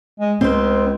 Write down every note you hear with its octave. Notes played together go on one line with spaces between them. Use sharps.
G#3
C#2 C4 C5